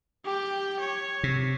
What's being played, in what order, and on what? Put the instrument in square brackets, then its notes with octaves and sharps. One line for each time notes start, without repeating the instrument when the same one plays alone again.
[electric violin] G4 G5
C#5
[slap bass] C3